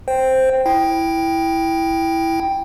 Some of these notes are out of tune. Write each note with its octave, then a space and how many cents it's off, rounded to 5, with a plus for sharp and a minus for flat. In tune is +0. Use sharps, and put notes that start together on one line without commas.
C5 +0 G5 +0
E4 +0 G5 +0